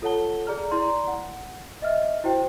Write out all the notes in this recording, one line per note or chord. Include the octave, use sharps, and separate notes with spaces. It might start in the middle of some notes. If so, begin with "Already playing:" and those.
F4 A4 C#5 F#5 A5 G7
G#4 D5 A#5 F6
E4 D5 A#5 C6
F#5
D#5 E5 F6
E4 F#4 C5 G5